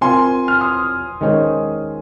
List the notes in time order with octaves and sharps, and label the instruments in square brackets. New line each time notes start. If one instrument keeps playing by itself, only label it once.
[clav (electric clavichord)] C4 F4 A#4 [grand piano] G#5 C6
[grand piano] F6
C6 D#6
[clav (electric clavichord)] D#3 G#3 C#4 G#4 C5